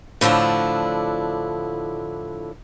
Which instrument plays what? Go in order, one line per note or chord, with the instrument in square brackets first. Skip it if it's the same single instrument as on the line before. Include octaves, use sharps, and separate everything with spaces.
[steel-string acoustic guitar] A2 D3 F3 D4 E4